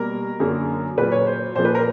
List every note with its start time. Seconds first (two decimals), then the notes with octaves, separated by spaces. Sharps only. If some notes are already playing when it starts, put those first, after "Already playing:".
Already playing: B2 G3 A#3 A#4
0.40 F#2 D3 F#3 A#3
0.97 A#2 F#3 A#3 B4
1.12 C#5
1.27 C5
1.55 A#2 F3 A#3 C5
1.65 B4
1.75 A#4